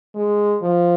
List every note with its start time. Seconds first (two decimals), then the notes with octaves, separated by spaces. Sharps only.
0.15 G#3
0.62 F3